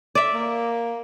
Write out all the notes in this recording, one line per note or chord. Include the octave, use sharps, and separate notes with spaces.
D5 E5
A#3